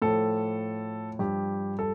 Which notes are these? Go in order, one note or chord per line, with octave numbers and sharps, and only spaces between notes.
A2 F3 A4
G2 F3 G4
A4